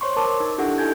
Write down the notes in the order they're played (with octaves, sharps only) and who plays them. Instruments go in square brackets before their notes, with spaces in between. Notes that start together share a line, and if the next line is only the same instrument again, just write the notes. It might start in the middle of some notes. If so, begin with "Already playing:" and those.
[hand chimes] C5 C#5 C6 C#6
A#4 A5 C#6 D6
D#4
D4 E4 G4 A4 F#5
D#4 E4 A4 G#5 G6 G#6